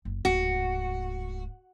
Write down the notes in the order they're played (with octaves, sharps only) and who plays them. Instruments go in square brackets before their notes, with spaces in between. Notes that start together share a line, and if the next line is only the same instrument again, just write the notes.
[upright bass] F#1
[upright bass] D1 G#2 [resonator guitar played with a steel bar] F#4